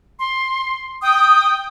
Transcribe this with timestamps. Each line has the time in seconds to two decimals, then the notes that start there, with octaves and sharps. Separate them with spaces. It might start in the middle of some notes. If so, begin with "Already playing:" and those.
0.19 C6
1.02 G5 D#6